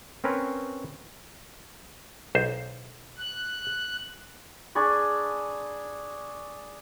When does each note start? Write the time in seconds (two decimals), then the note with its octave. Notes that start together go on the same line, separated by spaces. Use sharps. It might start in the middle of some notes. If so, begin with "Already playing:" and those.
0.24 C4 C#4 A#4 B4 C#5
2.35 B1 C5
3.17 F#6
4.75 D4 G#4 B5 C#6